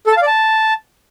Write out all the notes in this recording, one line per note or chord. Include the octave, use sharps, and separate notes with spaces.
A4
A5
F5
D5
A5